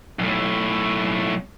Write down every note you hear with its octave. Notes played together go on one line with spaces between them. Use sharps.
B1 A2